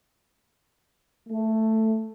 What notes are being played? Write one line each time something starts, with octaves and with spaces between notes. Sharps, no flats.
A3